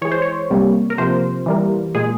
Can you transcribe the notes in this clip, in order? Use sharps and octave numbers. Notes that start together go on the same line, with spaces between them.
E3 G#3 C#5
C5
C#5
C3 G3 A#3
A#4
C3 F3 A#3 C5
E3 G3 A#3
A#2 G#3 G#4